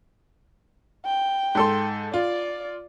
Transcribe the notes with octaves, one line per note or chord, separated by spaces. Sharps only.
G5
G#2 A4 C6
F4 D5